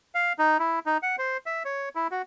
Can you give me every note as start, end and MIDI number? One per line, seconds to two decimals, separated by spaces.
0.15 0.33 77
0.39 0.58 63
0.59 0.79 64
0.86 0.98 63
1.03 1.16 78
1.18 1.37 72
1.46 1.63 76
1.65 1.89 73
1.95 2.08 64
2.11 2.22 66